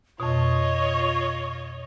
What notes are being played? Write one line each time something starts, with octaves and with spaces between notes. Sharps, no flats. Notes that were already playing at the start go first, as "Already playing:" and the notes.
F2 B2 F4 C#5 D#5 C#6